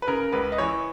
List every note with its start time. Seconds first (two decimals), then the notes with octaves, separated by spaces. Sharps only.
0.02 B4
0.08 C#3 A#4
0.32 C#2 B4
0.52 D#5
0.58 E3 C#5